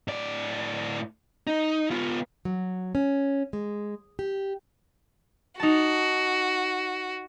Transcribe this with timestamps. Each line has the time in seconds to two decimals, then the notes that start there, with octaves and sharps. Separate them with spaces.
0.08 A2 D5
1.47 D#4
1.90 B3 F4
2.45 F#3
2.95 C#4
3.53 G#3
4.19 G4
5.60 D#4 F#4 A5